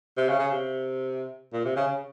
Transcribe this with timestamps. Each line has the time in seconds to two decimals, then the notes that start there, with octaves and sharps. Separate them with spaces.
0.17 C3
0.29 C#3
0.39 C#3
0.51 C3
1.53 A#2
1.65 C3
1.77 C#3
1.87 C#3